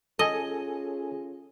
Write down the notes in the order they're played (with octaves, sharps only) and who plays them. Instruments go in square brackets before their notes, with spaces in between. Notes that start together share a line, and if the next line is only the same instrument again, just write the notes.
[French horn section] C#4 F4 G#4 [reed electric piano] A4 G#5 [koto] D#5